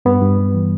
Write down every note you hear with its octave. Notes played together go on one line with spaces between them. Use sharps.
G2 B3
G2
G3
E3